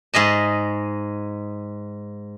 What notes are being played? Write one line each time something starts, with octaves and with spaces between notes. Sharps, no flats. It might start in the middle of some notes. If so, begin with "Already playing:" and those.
G#2 G#4 D#5 A5